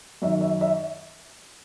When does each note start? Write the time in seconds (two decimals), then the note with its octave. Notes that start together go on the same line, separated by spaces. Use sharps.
0.22 F#2 D#3 E5
0.41 E5
0.61 E5